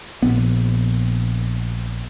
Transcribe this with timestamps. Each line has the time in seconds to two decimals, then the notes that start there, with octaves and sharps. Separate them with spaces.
0.22 A#1 B3